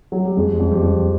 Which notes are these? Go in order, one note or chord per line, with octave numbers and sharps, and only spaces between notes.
F#3
G3
F2 G#3
F2
G3
F2